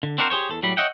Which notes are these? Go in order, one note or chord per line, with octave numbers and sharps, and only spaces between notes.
D3
C4 D4 F#4 A#4 C5
G4 G#4 C5 C#5
E2 A4
A2 F#3 G3 B5
C#5 D#5 E5 F#5 G5